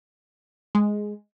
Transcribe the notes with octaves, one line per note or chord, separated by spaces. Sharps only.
G#3